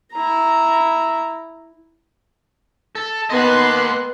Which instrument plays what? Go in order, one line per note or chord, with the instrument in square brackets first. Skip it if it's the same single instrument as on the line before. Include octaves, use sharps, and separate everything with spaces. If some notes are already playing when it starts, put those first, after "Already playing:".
[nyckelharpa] E4 A#5
[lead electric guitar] A4
[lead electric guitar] A#3 D#5 [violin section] B3 C6 F#6